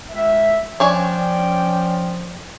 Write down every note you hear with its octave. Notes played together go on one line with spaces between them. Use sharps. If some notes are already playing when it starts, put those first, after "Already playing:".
C#2 E5
F3 C#4 D4 C#5 D5 G5 G#5